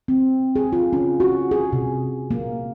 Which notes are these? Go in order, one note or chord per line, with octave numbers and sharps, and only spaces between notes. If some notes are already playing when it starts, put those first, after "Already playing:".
C4
G#4
F4
C#4
F#4
G#4
C3
A#3